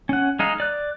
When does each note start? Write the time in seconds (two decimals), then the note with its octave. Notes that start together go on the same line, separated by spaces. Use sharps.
0.09 C#4 F#5
0.39 G#3 D#4 F5
0.60 D5 F#6